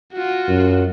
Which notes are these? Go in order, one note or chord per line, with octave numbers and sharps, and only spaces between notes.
F4 F#4
F#2